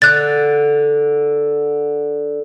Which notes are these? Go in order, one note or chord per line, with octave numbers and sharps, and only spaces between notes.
D3 F#6 A6